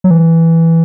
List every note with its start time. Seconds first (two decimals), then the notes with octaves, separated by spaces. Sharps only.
0.04 F#3
0.11 E3